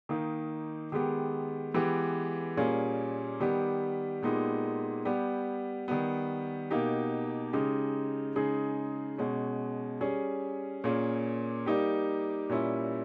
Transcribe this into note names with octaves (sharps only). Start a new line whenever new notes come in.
D#3 A#3 D#4
D#3 G#3 B3 G4
E3 G#3 B3 G4
A#2 G3 A#3 C#4 G#4
D#3 G3 B3 G4
A#2 G#3 B3 D#4 G4
G3 B3 G4
D#3 G3 B3
B2 A#3 D#4 G4
C#3 G#3 D#4 G4
C#3 G#3 D#4 G#4
B2 G#3 C#4
G3 C#4 G#4
A#2 A#3 C#4 G#4
G3 A#3 D#4 G4
A#2 G3 C#4 E4